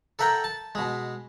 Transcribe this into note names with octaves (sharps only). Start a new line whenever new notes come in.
A4 A#4 E5 F#5 G5 A#5
A5
B2 G#3